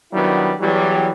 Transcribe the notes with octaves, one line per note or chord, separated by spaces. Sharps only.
D#3 F#3 G3 B3 D4 E4
E2 E3 F#3 G3